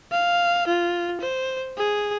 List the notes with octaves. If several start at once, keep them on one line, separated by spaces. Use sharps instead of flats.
F5
F4
C5
G#4